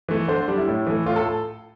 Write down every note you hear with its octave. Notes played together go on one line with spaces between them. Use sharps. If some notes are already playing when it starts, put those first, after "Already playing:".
E3 A3
D3 C5
G3 D4
E4
A2
E3 A3
A2 F4
A4